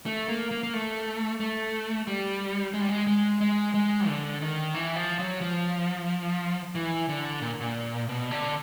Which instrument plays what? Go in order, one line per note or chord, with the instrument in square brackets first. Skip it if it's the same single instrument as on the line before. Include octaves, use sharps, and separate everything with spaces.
[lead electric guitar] A3
A#3
A#3
A#3
A3
A3
G3
G#3
G3
G#3
G#3
G#3
G#3
D3
D#3
E3
F3
F#3
F3
E3
D3
A#2
A#2
B2
D3